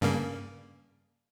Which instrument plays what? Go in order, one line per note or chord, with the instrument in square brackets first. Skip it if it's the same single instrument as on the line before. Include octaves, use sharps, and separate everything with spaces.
[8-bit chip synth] G2 C#3 A#3